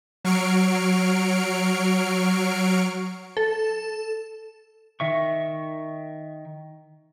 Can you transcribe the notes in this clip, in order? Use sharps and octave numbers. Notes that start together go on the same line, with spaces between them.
F#3 C#6 F6 C7 D7
A4
D#3 E5 C#6